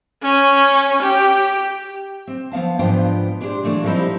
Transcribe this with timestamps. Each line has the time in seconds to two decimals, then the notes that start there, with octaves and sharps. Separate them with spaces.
0.23 C#4
1.03 G4
2.27 C4
2.52 F3 B3 F5 A5
2.79 G#2 F3 B3 D4 F4 G5
3.41 G#3 D4 G4 C5
3.63 E3 A3 A#3 D4
3.84 F3 G3 C4 D#4 E4